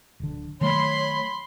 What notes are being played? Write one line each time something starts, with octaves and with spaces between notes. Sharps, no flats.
D1 D3
D#3 F#3 A3 C#5 B5 C6